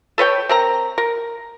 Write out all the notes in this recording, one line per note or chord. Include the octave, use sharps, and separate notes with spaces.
A4 B4 C#5 G5
C4 A#4 A#5
A#4